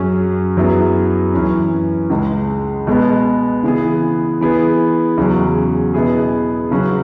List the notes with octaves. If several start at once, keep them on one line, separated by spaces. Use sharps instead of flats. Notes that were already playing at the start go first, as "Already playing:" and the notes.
Already playing: F#2 F#3 C#4 G#4
F#2 F#3 B3 E4 G#4
F#2 E3 C#4
C#2 C#3 G#3
B2 G#3 B3
C#3 E3 B3 G#4
E3 B3 G#4
E2 C#3 F#3 C#4 G#4
B2 B3 E4 G#4
C#3 F#3 C#4 F#4